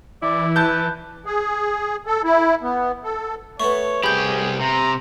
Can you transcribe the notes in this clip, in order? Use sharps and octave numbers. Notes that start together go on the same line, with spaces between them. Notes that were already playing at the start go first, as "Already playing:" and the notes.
E3 E4 D5
B4 A5 G6
G#4
A4
E4
B3
A4
A3 B3 C#5 C#6
C2 G4 G#4 B5 G6
C3 A#5